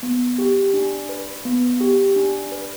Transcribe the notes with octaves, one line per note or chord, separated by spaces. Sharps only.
B3
G4
D4
B4
B3
G4
D4
B4